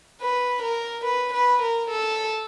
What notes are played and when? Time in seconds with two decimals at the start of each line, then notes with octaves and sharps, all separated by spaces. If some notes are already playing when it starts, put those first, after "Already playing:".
0.21 B4
0.63 A#4
1.05 B4
1.34 B4
1.62 A#4
1.90 A4